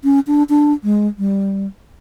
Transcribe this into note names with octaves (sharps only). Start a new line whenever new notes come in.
C#4
D4
D4
G#3
G3